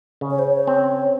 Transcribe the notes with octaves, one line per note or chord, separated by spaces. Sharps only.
C#3
C#5
C5
C#5
C4